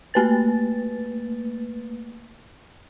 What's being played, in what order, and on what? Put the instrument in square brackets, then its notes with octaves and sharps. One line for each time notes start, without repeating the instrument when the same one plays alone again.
[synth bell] A3 A#3 B4 A6